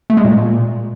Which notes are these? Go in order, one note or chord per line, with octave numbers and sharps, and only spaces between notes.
A3
G#3
A#2